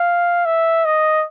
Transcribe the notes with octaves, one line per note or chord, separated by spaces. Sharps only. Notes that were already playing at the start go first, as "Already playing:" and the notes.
Already playing: F5
E5
D#5